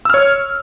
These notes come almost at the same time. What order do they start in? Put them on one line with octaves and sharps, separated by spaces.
E6 F6 C#5